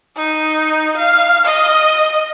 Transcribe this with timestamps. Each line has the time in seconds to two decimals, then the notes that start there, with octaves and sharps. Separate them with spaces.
0.17 D#4
0.97 F5
1.45 D#5